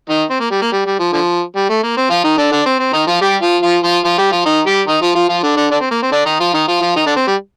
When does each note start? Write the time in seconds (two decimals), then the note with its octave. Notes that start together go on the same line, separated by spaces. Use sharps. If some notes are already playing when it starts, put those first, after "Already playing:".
0.09 D#3 D#4
0.30 C4
0.40 A#3
0.51 G3
0.62 A#3
0.72 G3
0.86 G3
0.99 F3
1.13 D3 F3
1.55 G3
1.69 A3
1.83 A#3
1.97 C4
2.10 F3 F4
2.24 D#3 D#4
2.37 D3 D4
2.51 D3 D4
2.66 C4
2.79 C4
2.93 D#3 D#4
3.07 F3 F4
3.21 G3 G4
3.42 F3 F4
3.63 F3 F4
3.83 F3 F4
4.04 F3 F4
4.18 G3 G4
4.31 F3 F4
4.45 D#3 D#4
4.66 G3 G4
4.87 D#3 D#4
5.02 F3 F4
5.15 F3 F4
5.29 F3 F4
5.43 D3 D4
5.56 D3 D4
5.70 D3 D4
5.81 C4
5.91 A#3
6.03 C4
6.12 D3 D4
6.26 D#3 D#4
6.40 F3 F4
6.54 D#3 D#4
6.68 F3 F4
6.81 F3 F4
6.96 D#3 D#4
7.06 D3 D4
7.16 C4
7.27 G3